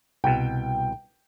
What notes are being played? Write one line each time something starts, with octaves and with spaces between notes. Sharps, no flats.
C2 B2 G5